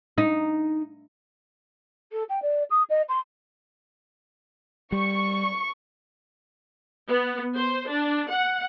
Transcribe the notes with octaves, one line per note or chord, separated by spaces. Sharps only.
D#4
A4
G5
D5
D#6
D#5
C6
G3 C#6
B3
C5
D4
F#5